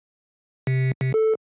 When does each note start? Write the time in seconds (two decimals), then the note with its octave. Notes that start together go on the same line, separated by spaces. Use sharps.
0.67 C3
1.01 C3
1.14 A4